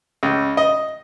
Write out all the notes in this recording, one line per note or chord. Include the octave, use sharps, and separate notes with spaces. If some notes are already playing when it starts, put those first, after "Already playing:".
C#2
D#5